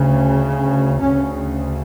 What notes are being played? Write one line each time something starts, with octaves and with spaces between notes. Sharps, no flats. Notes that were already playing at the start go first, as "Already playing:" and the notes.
Already playing: D2 C#3
D2 C#3 C#4